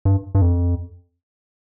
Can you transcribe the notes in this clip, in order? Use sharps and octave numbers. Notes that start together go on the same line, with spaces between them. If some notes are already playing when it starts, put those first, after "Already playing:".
G2
G2
F2